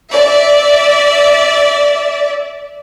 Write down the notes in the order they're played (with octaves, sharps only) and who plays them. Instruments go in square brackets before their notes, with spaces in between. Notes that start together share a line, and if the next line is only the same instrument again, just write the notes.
[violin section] D5 E5